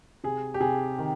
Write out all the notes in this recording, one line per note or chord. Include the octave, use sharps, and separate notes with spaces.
C3 G#4
G4
C3 G#4
D#3